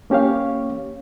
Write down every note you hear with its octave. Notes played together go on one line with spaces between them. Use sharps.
A#3 C#4 G4 C#5 F5